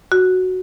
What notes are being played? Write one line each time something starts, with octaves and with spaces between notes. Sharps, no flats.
F#4